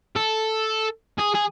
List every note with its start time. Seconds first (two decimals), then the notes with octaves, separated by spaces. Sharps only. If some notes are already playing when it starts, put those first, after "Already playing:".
0.16 A4
1.18 G#4
1.34 G#4